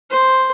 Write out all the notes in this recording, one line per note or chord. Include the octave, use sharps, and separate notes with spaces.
C5